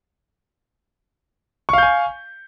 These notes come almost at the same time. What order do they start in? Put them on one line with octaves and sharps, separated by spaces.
C#6 F5 G6 G#5